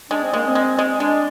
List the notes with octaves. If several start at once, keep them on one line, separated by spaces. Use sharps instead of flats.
G#3 D4
C4
G#3 A#3
C4
G#3
G#3
G#3 D4